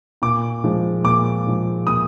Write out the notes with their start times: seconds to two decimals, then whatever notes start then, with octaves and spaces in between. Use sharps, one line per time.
0.22 A#2 D6
0.64 F3 G#3
1.04 A#2 D6
1.46 F3 G#3
1.87 A#2 D#6